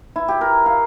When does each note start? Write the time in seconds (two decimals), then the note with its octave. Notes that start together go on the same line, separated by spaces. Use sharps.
0.16 E4
0.28 G4
0.41 A#4
0.66 F5